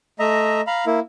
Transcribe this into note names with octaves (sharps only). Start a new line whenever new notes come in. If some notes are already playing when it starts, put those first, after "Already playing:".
A3 D#5 E5 A#5
F5 A#5 B5
A#3 E4